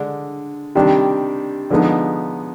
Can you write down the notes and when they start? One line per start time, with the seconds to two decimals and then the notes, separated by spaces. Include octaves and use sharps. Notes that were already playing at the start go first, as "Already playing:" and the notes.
Already playing: D3 G#3 D4
0.75 C3 D#3 G3 D4
1.70 D3 F3 G#3 B3 D#4